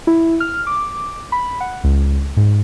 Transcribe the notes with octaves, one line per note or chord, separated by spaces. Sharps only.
E4
F6
D6
B5
F#5
C#2
G#2